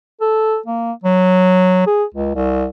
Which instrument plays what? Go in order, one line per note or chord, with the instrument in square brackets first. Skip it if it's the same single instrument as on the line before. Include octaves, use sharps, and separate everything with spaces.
[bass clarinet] A4
A#3
F#3
G#4
C#2
C2